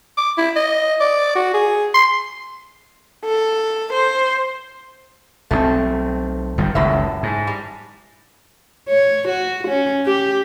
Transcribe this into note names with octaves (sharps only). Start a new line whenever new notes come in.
D6
E4
D#5
D5
F#4
G#4
C6
A4
C5
B1 F3 A3 C4
G1 D#3 G3
F#1 C#2 F#2 A2 E5
G#2
G3
C#5
F#4
C#4
G4